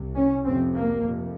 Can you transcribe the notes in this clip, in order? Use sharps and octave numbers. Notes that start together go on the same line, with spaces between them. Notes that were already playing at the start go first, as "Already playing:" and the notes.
Already playing: C2 C3
C#4
F1 F2 C3 C4
A#3
F1 F2 C3